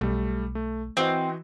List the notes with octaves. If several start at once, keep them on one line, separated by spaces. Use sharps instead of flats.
B1 G3 A3
A3
E3 C4 F#4 D#5